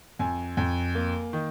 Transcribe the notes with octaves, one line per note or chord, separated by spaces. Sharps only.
F2 G#5
F2
A#3
D#3